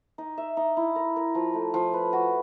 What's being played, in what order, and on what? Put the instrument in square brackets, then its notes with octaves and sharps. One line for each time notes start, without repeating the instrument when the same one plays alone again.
[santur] D#4
E5
D#4
E4
A#4
A#4
F3
A3
F3
B4
F#4